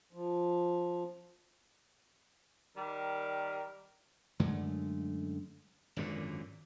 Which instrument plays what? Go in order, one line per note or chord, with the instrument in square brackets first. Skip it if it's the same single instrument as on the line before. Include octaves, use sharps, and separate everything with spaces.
[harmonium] F3
[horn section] D#3 G3 A#4
[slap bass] F#2 D3 G#3 A3
G#1 F#2 A#2 D3